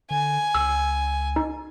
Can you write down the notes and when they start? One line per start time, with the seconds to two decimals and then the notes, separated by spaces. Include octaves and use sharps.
0.11 D3 G#5
0.55 C#2 E6
1.36 D#4